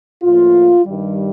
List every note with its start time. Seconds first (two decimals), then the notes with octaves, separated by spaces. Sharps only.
0.23 A2 F3 A#3 F4
0.85 G2 D#3 G3